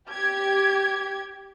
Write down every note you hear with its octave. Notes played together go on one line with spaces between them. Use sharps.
G4 G#6